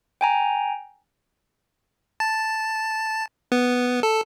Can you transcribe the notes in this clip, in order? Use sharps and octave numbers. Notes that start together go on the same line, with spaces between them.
G5 G#5 A#5
A5
B3
A4